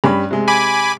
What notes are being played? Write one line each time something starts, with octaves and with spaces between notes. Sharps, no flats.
G2 C#4 B5
C3 G#3
G#5 B5 D6